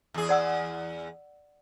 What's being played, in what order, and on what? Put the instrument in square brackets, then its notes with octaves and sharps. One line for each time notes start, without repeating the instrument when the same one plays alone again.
[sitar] E2 G#4
[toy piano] D5 F#5 E6